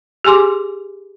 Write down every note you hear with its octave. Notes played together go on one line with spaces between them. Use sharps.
G4 G#4 G#5 C6 D6